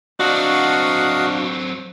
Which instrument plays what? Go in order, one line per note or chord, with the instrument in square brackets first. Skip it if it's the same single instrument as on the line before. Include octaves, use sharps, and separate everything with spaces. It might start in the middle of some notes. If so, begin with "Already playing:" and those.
[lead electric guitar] F#3 C4 [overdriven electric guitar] D4 [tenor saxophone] F#4 [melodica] D#5 F5 F#5